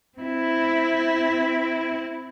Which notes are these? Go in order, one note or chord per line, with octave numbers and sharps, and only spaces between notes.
C4 E4